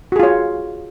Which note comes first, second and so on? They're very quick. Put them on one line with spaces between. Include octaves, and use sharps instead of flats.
F#4 G#4 F4 C#5